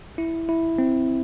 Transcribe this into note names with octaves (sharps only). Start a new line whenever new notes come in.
E4
E4
C4